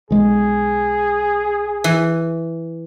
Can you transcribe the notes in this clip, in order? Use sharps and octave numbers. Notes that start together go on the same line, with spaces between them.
B1 G#3 G#4
E3